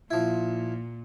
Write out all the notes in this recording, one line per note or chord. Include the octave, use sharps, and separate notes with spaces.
A#2 F3 E4